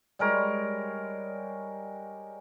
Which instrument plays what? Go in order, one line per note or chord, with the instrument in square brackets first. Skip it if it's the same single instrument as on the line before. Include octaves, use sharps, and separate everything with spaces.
[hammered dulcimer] G3 G#3 A#4 C#5